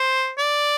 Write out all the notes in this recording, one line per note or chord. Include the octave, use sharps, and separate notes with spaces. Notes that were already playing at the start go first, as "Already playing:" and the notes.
Already playing: C5
D5